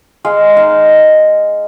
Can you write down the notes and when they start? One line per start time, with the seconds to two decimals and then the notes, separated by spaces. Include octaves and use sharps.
0.25 G#3 F5
0.57 D#4 F5